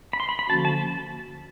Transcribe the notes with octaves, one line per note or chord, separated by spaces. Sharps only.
B5
C6
B5
B5
D3 F3 A#3 C#4 F#4 A5
A5